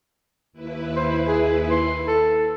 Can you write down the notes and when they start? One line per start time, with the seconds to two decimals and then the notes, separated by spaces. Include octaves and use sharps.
0.53 D#2 E4 B4
0.96 C5
1.28 G#4
1.70 C6
2.08 A4